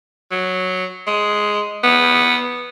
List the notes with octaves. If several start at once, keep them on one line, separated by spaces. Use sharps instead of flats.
F#3
G#3
B3